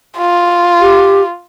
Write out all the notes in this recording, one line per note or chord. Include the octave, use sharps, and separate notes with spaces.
F4
G4